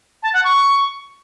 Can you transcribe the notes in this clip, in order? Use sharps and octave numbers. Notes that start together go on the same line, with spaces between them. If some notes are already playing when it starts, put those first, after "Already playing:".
A5
F#5
C#6